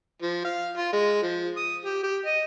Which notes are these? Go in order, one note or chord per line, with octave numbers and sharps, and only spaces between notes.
F3
F5
F4
G#3
F3
D#6
G4
G4
D#5